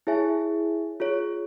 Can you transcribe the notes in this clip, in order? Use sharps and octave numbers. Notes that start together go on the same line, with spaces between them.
E4 G#4 C#5 E5 G#5
F4 G#4 C#5